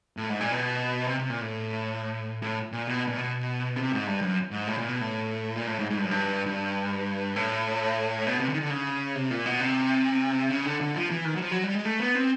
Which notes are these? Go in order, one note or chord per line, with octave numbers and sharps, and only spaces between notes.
A2
G#2
A#2
B2
C3
C3
A#2
A2
A2
A#2
B2
A#2
B2
C3
G#2
G2
F#2
G#2
A2
A#2
B2
A2
A#2
A2
G#2
G#2
G2
F#2
G2
G2
A2
B2
C3
D3
D#3
D3
C#3
C3
A#2
B2
C3
C#3
D3
D3
F3
E3
D#3
F#3
F3
F#3
G3
G#3
A3
B3
C4